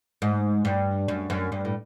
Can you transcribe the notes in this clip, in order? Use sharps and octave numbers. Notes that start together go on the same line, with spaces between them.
G#2
G2
F#2
F#2
G2
A2